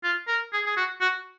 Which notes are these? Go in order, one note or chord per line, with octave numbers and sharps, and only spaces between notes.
F4
A#4
G#4
G#4
F#4
F#4